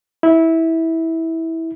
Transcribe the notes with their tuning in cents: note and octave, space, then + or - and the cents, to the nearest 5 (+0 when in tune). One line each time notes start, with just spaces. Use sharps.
E4 -15